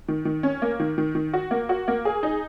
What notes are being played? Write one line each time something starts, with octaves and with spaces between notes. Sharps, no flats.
D#3
D#3
C#4
A#3
D#3
D#3
D#3
F#4
A#3
F#4
A#3
G#4
D#4